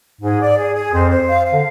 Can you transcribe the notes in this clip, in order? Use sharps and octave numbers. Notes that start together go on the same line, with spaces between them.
G#2 G#4
D5
G#4
G#4
F2 C5
C5
F5
F5
D3